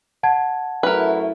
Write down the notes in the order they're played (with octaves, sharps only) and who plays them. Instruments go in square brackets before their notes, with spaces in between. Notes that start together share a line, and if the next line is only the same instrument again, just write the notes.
[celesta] F#5 A5 G#6
[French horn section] F#2 A3 E4 [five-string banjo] A#4 B4